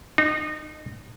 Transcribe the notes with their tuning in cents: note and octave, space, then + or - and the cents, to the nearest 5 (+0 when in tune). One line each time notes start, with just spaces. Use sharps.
D#4 -30